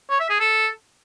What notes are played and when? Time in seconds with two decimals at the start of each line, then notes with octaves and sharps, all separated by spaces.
0.10 C#5
0.20 E5
0.30 G#4
0.40 A4